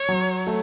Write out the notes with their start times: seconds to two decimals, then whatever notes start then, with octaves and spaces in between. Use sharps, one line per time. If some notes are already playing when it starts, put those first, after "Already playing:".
Already playing: C#5
0.09 F#3
0.47 A3